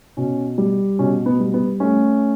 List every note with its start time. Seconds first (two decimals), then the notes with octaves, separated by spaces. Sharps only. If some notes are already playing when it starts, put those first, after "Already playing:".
0.17 B2 C#4
0.58 G3
0.99 B2 C#4
1.26 B3
1.40 G3
1.54 B3
1.80 A3 C#4